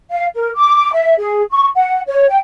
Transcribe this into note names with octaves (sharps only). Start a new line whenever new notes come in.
F5
A#4
D6
E5
G#4
C#6
F#5
C#5
G5